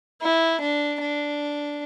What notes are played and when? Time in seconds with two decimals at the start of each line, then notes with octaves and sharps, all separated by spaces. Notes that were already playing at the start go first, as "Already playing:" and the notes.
0.22 E4
0.60 D4
1.00 D4